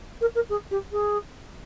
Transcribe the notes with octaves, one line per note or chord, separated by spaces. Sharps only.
A#4
A#4
G#4
G4
G#4